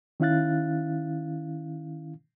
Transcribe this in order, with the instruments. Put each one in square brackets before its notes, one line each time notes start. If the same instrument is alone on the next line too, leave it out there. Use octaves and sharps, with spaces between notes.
[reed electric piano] D#3 C#4 E4 F5 F#6 A6